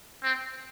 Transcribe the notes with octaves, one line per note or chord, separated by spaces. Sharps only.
C4